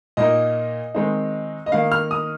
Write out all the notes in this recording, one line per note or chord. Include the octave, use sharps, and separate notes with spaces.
A#2 A#3 D#4 D#5
D#3 G#3 C4 D#4
D#5
D#3 A#3 D#4 F5
F6
D#6